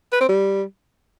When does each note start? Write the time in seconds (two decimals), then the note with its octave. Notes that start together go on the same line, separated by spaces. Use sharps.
0.12 B4
0.21 C4
0.29 G3